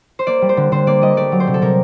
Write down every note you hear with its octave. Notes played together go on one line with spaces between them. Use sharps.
C5
A#3 D5
G3
C5
D3
D3 C5
A#3 D5
G3 D#5
A3 D5
F#3
C5
C3
A4
C3 A#4